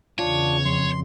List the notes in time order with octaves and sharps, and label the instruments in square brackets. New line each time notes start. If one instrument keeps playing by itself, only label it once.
[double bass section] E2 C#3 [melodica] D4 [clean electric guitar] F4 [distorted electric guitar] C#5
[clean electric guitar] F2 [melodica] C6